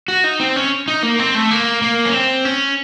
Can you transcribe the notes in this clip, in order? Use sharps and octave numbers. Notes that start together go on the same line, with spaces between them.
F#4
D#4
C4
C#4
D#4
A#3
C4
A3
A#3
A#3
C#4
C4
C#4